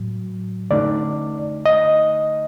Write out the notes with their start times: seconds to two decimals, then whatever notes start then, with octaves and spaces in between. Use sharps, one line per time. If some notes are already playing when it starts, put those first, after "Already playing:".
Already playing: A2 F#3
0.71 D3 A3 D#4 D5
1.66 D#5